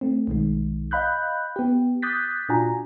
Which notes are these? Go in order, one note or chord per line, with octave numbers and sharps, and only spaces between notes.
A3 C4
B1 D#3 G#3
D#5 F5 B5 F#6 G6
B3 G4
D6 D#6 F#6 G6 A6 B6
A#2 D4 F4 F#4 G#5 A#5